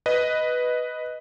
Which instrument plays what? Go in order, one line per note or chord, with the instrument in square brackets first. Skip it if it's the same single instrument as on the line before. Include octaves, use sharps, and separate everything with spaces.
[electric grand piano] B4 D#5